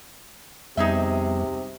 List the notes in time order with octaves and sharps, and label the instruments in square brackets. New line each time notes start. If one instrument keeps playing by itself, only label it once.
[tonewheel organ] F2 G3 B3 [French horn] C3 [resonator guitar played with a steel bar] D#4 G#4 E5